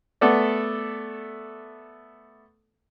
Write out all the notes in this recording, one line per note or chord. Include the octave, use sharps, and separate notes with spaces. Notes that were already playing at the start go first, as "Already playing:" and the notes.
A3 B3 A4 D5